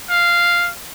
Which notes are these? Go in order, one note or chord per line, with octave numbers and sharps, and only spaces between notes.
F5